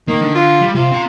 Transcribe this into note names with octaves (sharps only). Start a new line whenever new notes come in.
D#3 A#3
D3
F4
G3
C3 F4
C4 A#5